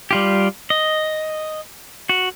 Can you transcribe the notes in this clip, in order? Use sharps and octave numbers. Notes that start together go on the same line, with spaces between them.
G3 F4 G4
D#5
F#4